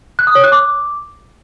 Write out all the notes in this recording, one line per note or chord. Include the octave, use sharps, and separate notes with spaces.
F#6
D#6
C#5
F#6
D6